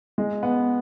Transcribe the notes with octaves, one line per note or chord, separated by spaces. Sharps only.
G#3
B3